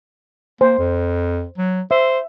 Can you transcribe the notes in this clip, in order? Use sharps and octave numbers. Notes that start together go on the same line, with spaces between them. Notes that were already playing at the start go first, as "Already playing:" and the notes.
A#3 C5
F2
F#3
C5 E5